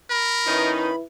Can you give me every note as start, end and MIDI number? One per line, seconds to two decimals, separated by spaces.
0.10 0.72 70
0.10 0.96 83
0.47 0.90 51
0.47 0.90 61
0.47 0.90 63
0.47 1.03 64
0.47 1.03 71